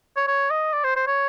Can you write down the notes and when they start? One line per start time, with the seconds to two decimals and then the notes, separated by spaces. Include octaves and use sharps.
0.16 C#5
0.27 C#5
0.50 D#5
0.73 D5
0.84 C5
0.96 C5
1.07 C#5